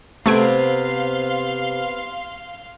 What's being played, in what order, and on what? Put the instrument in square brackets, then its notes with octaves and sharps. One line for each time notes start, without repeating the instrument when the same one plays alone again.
[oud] C3 [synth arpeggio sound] A3 G#6 D7 [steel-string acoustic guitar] B3 C4 [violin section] F5 C6